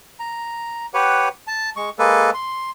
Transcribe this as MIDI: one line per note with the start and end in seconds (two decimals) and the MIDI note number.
0.20 0.86 82
0.94 1.28 67
0.94 1.28 71
0.94 1.28 73
0.94 1.28 78
1.47 1.70 81
1.77 1.90 56
1.77 1.90 85
1.99 2.31 56
1.99 2.31 58
1.99 2.31 69
1.99 2.31 71
2.34 2.70 84